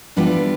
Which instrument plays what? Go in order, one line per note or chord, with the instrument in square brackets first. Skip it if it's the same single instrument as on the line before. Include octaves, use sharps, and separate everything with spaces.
[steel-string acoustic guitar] E3 G3 B3 D4 F4